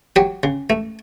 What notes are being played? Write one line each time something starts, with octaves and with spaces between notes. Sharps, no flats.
F#3 G4
C#3
A3